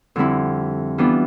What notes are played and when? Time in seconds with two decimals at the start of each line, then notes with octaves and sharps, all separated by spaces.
0.16 F2 D3 G3 C4 E4
0.98 E3 G3 B3 D4 F4